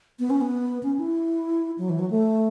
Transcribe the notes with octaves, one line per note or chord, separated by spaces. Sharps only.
B3
C#4
B3
C#4
E4
F#3
E3
F#3
A3